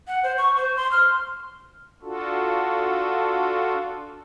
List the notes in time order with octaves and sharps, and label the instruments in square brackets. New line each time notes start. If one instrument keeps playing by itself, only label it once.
[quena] F#5
C5
C#6
C5
C6
F6
[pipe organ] D4 F4 F#4 A4